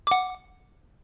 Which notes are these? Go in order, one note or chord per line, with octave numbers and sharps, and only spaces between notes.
F#5 D6